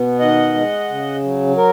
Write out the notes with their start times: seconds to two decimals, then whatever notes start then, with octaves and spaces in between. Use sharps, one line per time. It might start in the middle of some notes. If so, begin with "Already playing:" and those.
Already playing: B2 B3
0.19 D#3 D#5 F#5
0.54 G#3
0.89 C#3
1.24 F#3
1.57 A#4